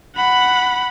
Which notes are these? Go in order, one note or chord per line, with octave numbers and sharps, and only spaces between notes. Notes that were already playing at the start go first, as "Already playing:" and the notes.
F#5 B5